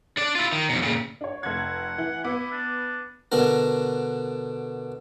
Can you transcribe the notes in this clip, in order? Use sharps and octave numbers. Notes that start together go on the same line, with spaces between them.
D4 D5
E4 F4
D#3
F2 B2
A#2 C#3
D4 C#5
F1 F#5 G#6
E3
B3 E4 D6
D4
B2 D3 D4 A#4